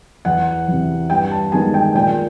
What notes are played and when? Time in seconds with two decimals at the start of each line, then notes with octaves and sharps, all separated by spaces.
0.25 E2 F#5
0.68 C3 E3
1.10 G2 G5
1.31 A5
1.52 D#3 G#3 B3 G#5
1.74 G5
1.94 A#2 G5